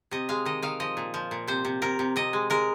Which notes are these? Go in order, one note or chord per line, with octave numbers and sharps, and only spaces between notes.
C3 D#5
G#3 F5
D#3 D#5
D#3 F5
F3 D#5
A#2
F3
A#2
C3 C5
C3
C3 A#4
C3
C3 D#5
G#3
G#3 A#4